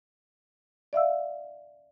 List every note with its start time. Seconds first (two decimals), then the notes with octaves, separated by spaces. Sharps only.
0.93 D5 E5 F5 E6